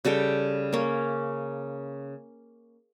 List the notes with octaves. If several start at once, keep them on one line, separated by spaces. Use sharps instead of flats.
C#3 G3 A4 G5
A#3 C#4